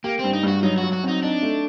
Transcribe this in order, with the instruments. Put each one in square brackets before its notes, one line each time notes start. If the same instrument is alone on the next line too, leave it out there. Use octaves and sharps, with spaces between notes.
[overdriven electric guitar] A#3 [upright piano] G4
[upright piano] G2 [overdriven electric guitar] C4
[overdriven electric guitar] D#4
[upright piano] G2
[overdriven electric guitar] F#4
[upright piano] F#3 [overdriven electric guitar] D#4
[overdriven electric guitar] F#4
[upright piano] F#3
[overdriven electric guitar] F#4
[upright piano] C4 [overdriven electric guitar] D#4
[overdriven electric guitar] D4 [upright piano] D#4
[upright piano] A3